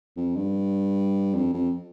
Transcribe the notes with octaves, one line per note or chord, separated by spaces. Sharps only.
F2
G2
F2
F2